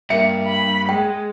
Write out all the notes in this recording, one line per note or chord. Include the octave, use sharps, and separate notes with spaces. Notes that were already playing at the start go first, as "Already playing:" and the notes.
G2 A#3 E5 C#7
B5
G#3 G5